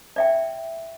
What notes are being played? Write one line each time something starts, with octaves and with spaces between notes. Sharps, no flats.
D5 E5 G5